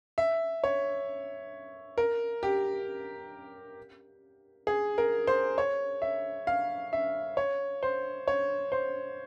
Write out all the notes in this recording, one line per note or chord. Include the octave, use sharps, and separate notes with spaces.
E5
C#5
A#4
G4
G#4
A#4
C5
C#5
E5
F5
E5
C#5
C5
C#5
C5